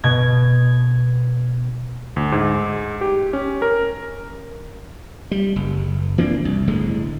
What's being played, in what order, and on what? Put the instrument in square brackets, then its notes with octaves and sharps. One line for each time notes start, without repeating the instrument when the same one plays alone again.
[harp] B2 G#6
[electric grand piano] D2
G#2
G4
C#4
A#4
[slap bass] G3
F#1
E3 A#3 C4 D4
C2
G1 A2 D3 G#3